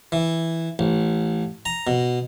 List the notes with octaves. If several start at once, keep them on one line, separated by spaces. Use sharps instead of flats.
E3
A1
A#5
B2